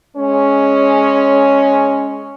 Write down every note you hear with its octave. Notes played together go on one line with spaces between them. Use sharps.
G#3 C#4